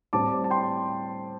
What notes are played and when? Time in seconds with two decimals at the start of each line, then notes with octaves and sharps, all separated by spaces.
0.13 A2 G3 C4 A5 D6
0.44 A5
0.50 G5 C6